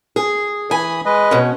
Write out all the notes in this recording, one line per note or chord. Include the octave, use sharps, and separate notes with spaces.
G#4
E3 G#5 B5 D#6
G#3 B4 D#5
B2 C#4